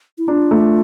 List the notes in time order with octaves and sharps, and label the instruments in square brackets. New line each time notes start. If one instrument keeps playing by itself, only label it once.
[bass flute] E4
[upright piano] D4 [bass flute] F4
[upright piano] A3